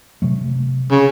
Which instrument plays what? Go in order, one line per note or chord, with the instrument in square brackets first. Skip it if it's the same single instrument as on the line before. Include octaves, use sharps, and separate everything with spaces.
[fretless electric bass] C3 F#3 A3
[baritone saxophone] C#3